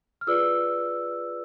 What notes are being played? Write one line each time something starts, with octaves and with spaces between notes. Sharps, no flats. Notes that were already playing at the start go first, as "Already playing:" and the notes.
F6
F4 G#4 B4 D5 E6